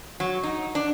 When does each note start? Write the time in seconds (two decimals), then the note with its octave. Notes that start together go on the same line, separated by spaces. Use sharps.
0.20 F#3
0.43 D#4
0.75 D4